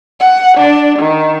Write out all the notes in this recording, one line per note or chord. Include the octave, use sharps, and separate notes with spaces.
F#5
D4
D#3